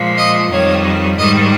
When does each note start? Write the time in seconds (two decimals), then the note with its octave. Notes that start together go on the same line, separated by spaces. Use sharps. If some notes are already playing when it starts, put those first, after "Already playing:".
Already playing: A#2 F3 G#3
0.17 D#5
0.51 F2 D#3 G3 C#5
1.17 G#2 D#3 G3 D#5